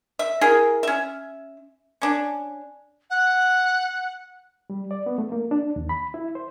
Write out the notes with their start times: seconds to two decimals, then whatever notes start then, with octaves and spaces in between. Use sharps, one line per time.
0.19 E5
0.41 E4 G#4 A#4
0.83 C#4 E5
2.02 C#4 D4
3.10 F#5
4.70 G3
4.91 D5
5.06 B3
5.18 A3
5.32 A#3
5.51 D4
5.76 D#2
5.89 B5
6.14 E4
6.35 C5